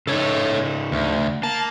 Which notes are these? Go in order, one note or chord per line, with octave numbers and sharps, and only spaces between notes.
C#3 D#4 A4 C#5
D2
A#3 A5